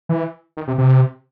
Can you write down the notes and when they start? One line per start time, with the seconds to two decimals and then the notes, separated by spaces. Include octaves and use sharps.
0.09 E3
0.57 D#3
0.68 C3
0.78 C3